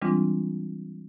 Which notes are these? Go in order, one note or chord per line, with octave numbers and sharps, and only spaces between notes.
E3 G3 G#3 C4 D4 F4